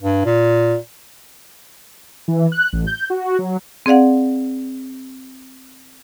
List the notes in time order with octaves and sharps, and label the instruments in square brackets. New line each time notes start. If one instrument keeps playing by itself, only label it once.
[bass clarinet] G2
A#2
[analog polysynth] E3
F#6
A1
G6
F#4
F#3
[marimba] C4 G#4 D5 F5 F#5